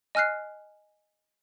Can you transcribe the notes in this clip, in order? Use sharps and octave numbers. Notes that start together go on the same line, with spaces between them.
D#5 G#5 F6 F#6 C7